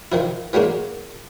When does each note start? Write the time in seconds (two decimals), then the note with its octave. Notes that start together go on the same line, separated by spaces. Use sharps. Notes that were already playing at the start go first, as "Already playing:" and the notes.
0.12 D#3 F3 E4
0.53 E3 F#3 G#3 A#3 D4